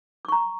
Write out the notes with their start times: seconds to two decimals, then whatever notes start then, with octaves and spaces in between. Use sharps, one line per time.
0.25 D6
0.28 C#6
0.32 A#5